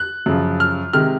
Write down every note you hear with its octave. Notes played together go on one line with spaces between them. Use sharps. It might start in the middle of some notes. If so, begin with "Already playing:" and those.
Already playing: F#6
F#2 C#3 F3
F6
C3 D#3 G#3 F6